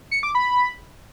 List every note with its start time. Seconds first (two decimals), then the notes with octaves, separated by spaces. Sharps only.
0.11 C#7
0.23 D6
0.35 B5